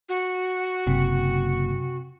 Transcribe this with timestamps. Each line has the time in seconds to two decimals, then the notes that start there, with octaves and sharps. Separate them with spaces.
0.09 F#4
0.87 F#1 C3